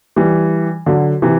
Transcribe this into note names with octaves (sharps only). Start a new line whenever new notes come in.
E3 G3
D3 F#3
C3 E3